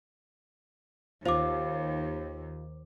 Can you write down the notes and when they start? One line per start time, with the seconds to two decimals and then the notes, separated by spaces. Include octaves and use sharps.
1.26 D#2 F4 C5 D6